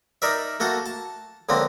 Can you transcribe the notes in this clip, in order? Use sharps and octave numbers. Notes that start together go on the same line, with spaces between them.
D#4 A#4 D5 E5
A3 A#3 F#4 A4
A5
C#2 D3 F3 A#3 C4